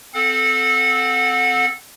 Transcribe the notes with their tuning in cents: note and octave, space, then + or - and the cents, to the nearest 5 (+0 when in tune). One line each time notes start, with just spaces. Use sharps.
C4 +0 A4 -10 F#5 -30